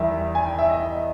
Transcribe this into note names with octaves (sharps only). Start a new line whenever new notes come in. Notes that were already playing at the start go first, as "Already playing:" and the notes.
Already playing: E2 D#3 G3 E5
G#5
G5
E5
D#5